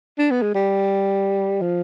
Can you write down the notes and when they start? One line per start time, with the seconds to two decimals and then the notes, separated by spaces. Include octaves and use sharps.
0.18 D4
0.31 B3
0.42 G#3
0.55 G3
1.61 F3